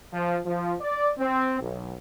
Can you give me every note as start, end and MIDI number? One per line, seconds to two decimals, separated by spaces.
0.13 0.38 53
0.46 0.74 53
0.81 1.11 74
1.18 1.60 60
1.61 1.94 35